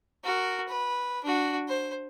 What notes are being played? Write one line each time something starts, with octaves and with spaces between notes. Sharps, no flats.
F#4 A#4
B4
D4 F#4
C5